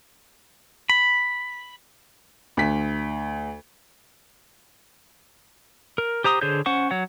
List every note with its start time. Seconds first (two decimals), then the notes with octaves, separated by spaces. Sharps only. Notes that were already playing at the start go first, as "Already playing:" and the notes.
0.89 B5
2.57 D2 B6
5.98 A#4
6.24 G4 C5 A#5 D#6
6.41 D3 G#4 C5 C#5 G6
6.66 C#4 C5 F#5 C#6
6.91 F#3 C#5 F#5